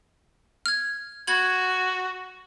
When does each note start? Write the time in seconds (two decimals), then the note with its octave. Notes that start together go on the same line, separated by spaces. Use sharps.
0.66 F6 G#6
1.27 F#4 B5 G#6 F#7